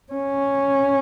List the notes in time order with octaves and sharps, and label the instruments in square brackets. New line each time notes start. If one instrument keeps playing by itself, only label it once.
[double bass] C#4